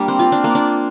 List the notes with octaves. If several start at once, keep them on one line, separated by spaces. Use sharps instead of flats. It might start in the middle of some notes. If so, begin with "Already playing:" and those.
Already playing: G3 A#3 D4
C4
F4
D4
A#3
D4